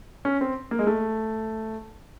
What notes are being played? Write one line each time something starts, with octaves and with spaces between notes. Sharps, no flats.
C#4
C4
A#3
G#3
A3